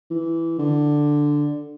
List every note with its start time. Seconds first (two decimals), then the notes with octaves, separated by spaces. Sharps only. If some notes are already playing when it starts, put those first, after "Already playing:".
0.11 E3
0.59 D3